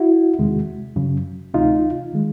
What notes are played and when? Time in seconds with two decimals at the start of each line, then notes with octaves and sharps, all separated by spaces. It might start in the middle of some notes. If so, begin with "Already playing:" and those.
Already playing: E4 F#4
0.39 E2 C3 D#3 G#3
0.96 F#2 C#3 F#3
1.54 D2 C3 E3 A3 D#4 F4
2.14 D#3 G#3